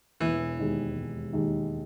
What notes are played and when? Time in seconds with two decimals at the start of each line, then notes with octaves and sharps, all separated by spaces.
0.20 E1 E3
0.59 D#2 D#3 G#3 D#4
0.96 E1
1.33 D#2 D#3 G#3 D#4